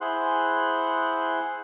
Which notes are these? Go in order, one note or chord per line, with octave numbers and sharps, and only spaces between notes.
E4 G#4 C5 F#5 C6 F#6